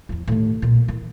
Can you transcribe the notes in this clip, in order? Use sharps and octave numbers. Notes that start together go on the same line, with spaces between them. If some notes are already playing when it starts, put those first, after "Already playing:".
E2 F3
D#2 A2
B1 A#2
E3